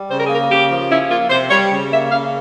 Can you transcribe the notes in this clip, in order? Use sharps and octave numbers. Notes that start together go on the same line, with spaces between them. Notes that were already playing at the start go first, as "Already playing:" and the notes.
Already playing: G3
C#3 C5
A#4
G#4
A#3 A#4
C#3 G4
F3
C#4 E4
A#3 F4
C3 C5
G3 C#5
C#3
A#3 E5
C#3 F5